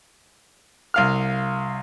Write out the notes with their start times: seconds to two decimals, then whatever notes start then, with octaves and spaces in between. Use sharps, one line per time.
0.94 C2 F5 F6